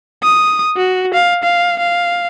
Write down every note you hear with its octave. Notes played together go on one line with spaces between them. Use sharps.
D#6
F#4
F5
F5
F5